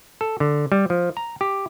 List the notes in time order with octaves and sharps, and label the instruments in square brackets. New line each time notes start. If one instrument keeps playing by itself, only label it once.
[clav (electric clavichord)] A4
D3
G3
F3
A#5
G4